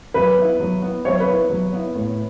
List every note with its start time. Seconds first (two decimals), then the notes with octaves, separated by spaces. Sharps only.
0.14 F#3 B4
0.38 B3 E4
0.60 F#3
0.82 B3 E4
1.05 F#3 C#5
1.20 B4
1.28 B3 E4
1.50 F#3
1.73 B3 E4
1.95 A2